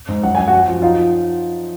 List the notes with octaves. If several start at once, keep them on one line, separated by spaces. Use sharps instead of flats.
G#2
F#2 F#5
F#2 G#5
F#2 F#4 F#5
F3
D#4 F4 F5